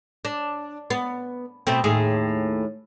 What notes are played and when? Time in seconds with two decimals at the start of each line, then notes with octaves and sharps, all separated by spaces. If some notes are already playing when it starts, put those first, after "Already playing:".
0.25 D4
0.90 B3
1.67 B2 A3 C4
1.84 D#2 A2 G#4